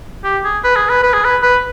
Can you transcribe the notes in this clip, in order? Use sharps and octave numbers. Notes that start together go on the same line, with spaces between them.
G4
G#4
B4
G#4
B4
B4
G#4
B4
B4